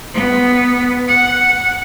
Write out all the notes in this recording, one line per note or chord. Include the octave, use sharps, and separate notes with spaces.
B3
F#5